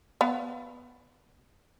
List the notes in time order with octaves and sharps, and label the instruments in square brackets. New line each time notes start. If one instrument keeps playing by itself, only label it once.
[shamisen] B3 F5